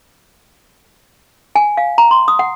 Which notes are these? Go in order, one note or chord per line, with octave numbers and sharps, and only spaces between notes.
G#5
F5
A#5
C6
D#6
F#5